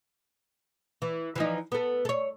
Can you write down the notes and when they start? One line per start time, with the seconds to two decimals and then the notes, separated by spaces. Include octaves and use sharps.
1.02 E3
1.36 E3 F3 D#4
1.72 B3 A4
2.05 A4 C#5